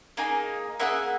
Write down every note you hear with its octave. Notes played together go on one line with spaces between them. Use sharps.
A#3 D#4 G#4
A#3 D#4 G#4 E5 F#5